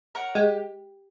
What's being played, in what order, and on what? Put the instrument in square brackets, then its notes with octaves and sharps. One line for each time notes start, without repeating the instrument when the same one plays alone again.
[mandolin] A#4 C#5 F#5
[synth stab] G#3 [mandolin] G4